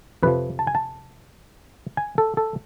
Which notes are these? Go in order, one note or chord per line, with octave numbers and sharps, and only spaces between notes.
F2 C3 F3 B4
A5
G#5
A5
G#5
A4
A4